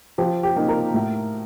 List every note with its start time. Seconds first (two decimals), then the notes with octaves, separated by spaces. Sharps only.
0.18 F3 G4
0.43 G4
0.56 A#3 D#4
0.69 A#4
0.94 A2